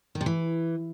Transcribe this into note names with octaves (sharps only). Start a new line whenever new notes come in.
D#3
C3
E3